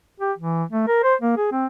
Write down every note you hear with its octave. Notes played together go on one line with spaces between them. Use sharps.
G4
E3
A3
A#4
C5
A#3
G#4
C4